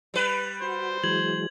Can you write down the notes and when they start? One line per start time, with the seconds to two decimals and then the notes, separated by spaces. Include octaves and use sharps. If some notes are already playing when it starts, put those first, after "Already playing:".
0.14 G3 B4
0.62 F#4 C5
1.04 E3 F#3 G#3 G#6 F#7